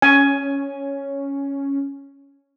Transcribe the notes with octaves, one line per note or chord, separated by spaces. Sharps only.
C#4 G#5